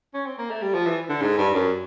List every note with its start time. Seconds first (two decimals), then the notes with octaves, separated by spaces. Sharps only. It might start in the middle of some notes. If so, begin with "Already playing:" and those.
0.14 C#4
0.26 C4
0.38 A#3
0.51 A3
0.62 G3
0.75 F3
0.86 E3
1.09 D3
1.21 G#2
1.38 G2
1.54 F#2